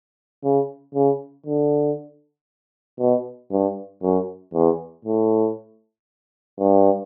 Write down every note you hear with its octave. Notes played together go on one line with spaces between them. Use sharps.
C#3
C#3
D3
B2
G2
F#2
E2
A2
G2